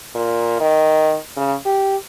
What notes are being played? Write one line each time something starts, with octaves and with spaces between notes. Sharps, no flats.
A#2
D#3
C#3
G4